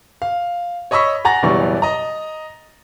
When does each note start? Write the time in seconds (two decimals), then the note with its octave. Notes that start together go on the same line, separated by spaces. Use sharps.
0.22 F5
0.91 C#5 D#5 B5 C#6 E6 B6
1.25 F#5 G#5 A#5 A6 A#6
1.43 F#1 B2 E3 G3 D5 C#6
1.82 D#5 A#5